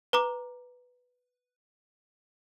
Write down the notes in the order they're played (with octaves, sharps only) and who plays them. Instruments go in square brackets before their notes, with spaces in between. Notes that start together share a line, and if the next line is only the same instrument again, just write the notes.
[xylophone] B4 A#5 D6